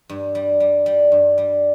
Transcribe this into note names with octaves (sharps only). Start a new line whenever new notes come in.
G2
G3
G3
G3
G2
G3